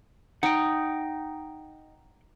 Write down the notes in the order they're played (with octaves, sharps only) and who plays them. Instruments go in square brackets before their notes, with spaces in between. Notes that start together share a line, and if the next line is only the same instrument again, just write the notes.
[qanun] D#4 [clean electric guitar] F#5 G5